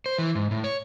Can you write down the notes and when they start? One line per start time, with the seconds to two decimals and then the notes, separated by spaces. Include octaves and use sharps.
0.06 C5
0.18 E3
0.35 G#2
0.51 A2
0.64 C#5